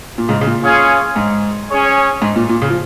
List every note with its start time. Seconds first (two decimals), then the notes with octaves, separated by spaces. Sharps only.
0.18 A#2
0.29 G#2 C#3
0.41 C#3
0.47 A#2
0.64 C#4 F4 G#4 C#5 F5
1.16 G#2
1.69 C#4 G#4 C#5
2.22 G#2
2.36 A#2
2.49 A#2
2.62 C#3
2.70 F3